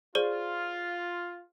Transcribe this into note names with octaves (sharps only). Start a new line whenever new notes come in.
F4 G#4 C5 D5